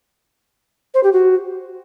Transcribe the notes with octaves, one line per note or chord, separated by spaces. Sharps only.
C5
G4
F#4